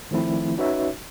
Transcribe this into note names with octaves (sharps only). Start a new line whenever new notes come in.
D#3 F3 A3 C4 E4
C#4 D#4 F#4 B4 C#5 E5